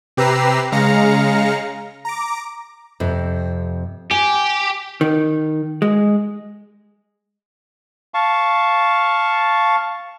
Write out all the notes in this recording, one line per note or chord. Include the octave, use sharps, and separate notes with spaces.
C3 G4 B4 A#5 E6 C7
C#3 G#3 F5 A#5 A#6 C#7
A#5 D6
F2 C3
G4 G#5
D#3
G#3
F5 A5 C#6